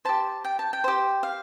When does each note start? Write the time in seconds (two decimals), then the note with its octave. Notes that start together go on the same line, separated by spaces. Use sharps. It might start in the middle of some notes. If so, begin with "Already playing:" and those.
0.05 G4 C5 A5
0.44 G5
0.59 A5
0.73 G5
0.84 G4 C5
1.23 F5